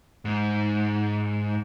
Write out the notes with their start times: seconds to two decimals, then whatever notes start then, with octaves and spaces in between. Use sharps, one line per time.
0.25 G#2